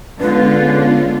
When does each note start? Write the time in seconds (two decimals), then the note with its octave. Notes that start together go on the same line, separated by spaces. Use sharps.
0.20 D3 G#3 B3 C#4 F4 B4